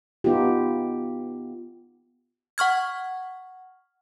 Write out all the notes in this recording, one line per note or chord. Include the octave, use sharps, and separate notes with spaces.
B3 D#4 F4 G4
F#5 C#6 F6 G#6